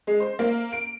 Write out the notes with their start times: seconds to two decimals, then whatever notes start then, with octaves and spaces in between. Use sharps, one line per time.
0.07 G#3
0.20 C5
0.39 A#3
0.72 D7